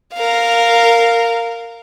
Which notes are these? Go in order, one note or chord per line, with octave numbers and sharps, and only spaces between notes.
A#4 F5